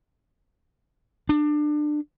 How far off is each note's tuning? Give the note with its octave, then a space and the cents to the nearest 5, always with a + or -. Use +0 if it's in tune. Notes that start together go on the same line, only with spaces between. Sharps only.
D4 +25